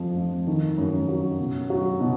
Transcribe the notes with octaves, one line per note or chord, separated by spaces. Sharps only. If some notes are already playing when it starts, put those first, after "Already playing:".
Already playing: F2 F3
F2
D#3
F#2
F#3
B2
F#3
B2